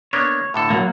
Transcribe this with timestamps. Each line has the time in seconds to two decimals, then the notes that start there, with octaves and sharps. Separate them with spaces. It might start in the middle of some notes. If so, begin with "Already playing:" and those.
0.13 A#3 B3 D4 C#5
0.54 A2 D3 A4
0.70 F#3 A#3